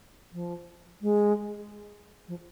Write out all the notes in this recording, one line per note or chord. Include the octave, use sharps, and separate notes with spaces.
F3
G#3
F3